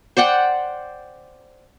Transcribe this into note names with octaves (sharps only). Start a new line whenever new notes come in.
C5 D5 F#5 G5